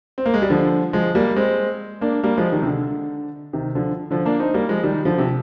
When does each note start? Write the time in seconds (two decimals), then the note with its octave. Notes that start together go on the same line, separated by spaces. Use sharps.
0.18 C4
0.26 A#3
0.34 G#3
0.42 G3
0.50 D3 F3
0.93 F3 G#3
1.15 G3 A#3
1.36 G#3 C4
2.01 A#3 D4
2.23 G3 A#3
2.37 F3 G#3
2.52 D#3 G3
2.62 C3
2.66 D3
3.53 C3 D#3
3.75 D3 F3
4.11 D3 F3
4.25 A#3 D4
4.40 C4 D#4
4.54 G3 A#3
4.69 F3 G#3
4.83 D#3 G3
5.05 D3 F3
5.18 C3